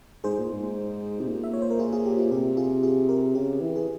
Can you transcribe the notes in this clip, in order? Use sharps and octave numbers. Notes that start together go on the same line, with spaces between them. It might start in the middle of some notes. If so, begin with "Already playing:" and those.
G#2 G#4 C5
A#2
G#2
C3
A#2
E5
C#5
C5
A#4
F4 G#4
F4 G#4
G4
F4
C3 G4
F4 G#4
F4 G#4
G4 A#4
C#3 G4
E3
G#4